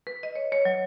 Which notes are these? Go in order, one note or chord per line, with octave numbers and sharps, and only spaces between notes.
B4
D#5
C#5
C#5
F#3